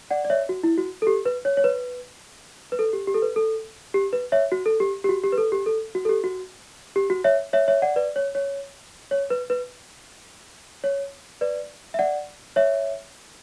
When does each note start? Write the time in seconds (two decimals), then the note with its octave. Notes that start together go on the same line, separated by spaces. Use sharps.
0.11 D5 F#5
0.25 D5
0.30 C#5 E5
0.49 F#4
0.63 E4
0.78 F#4
1.02 A4
1.07 G4
1.25 B4
1.45 C#5
1.57 C#5
1.64 B4
2.72 B4
2.79 A4
2.93 G4
3.07 G4
3.14 A4
3.22 B4
3.36 A4
3.94 G4
4.13 B4
4.32 C#5 E5
4.52 F#4
4.66 A4
4.80 G4
5.04 G4
5.09 F#4
5.24 G4
5.32 B4
5.38 A4
5.52 G4
5.66 A4
5.95 F#4
6.05 A4
6.09 G4
6.24 F#4
6.96 G4
7.10 F#4
7.24 C#5 E5
7.53 C#5 E5
7.68 C#5 E5
7.82 D5 F#5
7.96 B4 D5
8.16 C#5
8.35 C#5
9.11 C#5
9.30 B4
9.50 B4
10.84 C#5
11.41 B4 D5
11.94 E5
11.99 D5 F#5
12.56 C#5 E5